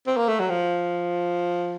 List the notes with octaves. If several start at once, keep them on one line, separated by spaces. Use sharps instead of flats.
C4
A#3
A3
F#3
F3